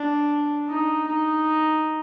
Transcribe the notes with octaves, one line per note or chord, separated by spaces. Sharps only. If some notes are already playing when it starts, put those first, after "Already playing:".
Already playing: D4
D#4
D#4